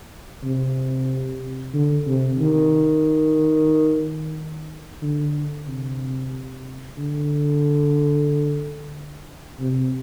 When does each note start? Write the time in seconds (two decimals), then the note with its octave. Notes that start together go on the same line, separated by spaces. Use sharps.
0.44 C3
1.74 D3
2.07 C3
2.39 D#3
5.02 D3
5.68 C3
6.98 D3
9.60 C3